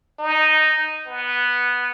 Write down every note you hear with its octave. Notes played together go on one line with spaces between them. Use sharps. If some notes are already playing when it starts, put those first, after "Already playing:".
D#4
B3